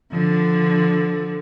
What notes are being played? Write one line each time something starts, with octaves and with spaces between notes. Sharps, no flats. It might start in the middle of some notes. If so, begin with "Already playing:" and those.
D3 F3